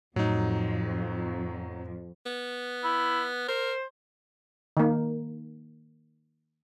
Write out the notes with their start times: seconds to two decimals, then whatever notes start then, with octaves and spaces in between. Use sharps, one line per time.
0.16 F2 A2 F#3 D#4
2.26 B3
2.84 E4
3.48 A#4 C5
4.77 D#3 A#3